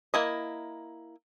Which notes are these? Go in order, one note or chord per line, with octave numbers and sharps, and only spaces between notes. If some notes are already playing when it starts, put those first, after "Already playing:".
A#3 E4 D#5